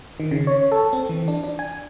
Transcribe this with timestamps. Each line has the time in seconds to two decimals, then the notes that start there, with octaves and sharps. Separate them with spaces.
0.20 D#3
0.31 C#3
0.47 C#5
0.72 A4
0.93 C4
1.09 E3
1.28 D4
1.44 D4
1.59 G#5